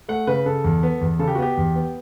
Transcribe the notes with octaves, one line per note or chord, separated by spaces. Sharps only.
A3 F#5
C#3 B4
C#3 A4
E2
B3
E2
C#3 A4
G4
F#4
B3 G4
E2
B3